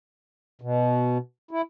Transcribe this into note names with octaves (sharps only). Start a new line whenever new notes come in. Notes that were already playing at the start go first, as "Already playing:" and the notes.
B2
E4